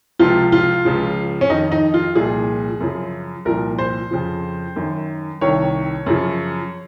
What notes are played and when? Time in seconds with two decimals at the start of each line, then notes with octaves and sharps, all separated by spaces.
0.19 C#2 C3 F3 F4
0.52 F4
0.85 C#2 C#3 F3
1.41 C#4
1.50 F2 D#3 D#4
1.72 D#4
1.94 F4
2.15 C2 A#2 F3 G#4
2.81 F#2 C#3 F3
3.45 C2 A#2 F3 A#4
3.79 C5
4.11 F2 C#3 F3
4.76 F#2 D#3
5.41 C2 C3 D#3 C#5
6.06 F#2 C#3 F3